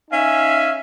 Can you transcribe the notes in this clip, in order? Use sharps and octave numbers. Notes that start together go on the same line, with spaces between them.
C#4 D#4 E5 F5 G#5